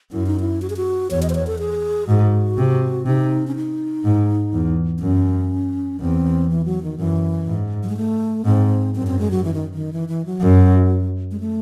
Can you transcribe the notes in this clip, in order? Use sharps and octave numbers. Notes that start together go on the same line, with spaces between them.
F#2 E4
D#4
E4
F#4
G#4
F#4
E2 C#5
D#5
C5
C#5
A4
G#4
G#2 F#4
C3
C3 D#4
C#4
D#4
G#2
E2
C4
F#2 C#4
E2 C4
E3
F#3
D#3
F#2 E3
G#2
F#3
G#3
A3
G#2 C4
F#2 C4
C4
G#3
F#3
E3
D#3
D#3
E3
E3
F#3
F#2
G#3
A3